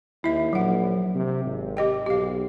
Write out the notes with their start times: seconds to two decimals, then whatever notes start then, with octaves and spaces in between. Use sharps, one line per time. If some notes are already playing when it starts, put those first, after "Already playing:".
0.24 D#2 E4 E5
0.53 A#1 F#3 F#5
1.15 C3
1.45 G#1
1.77 G4 D#5 G5
2.06 B1 G4 F5